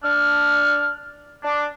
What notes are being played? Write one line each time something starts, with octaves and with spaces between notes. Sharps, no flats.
D4 F6
D4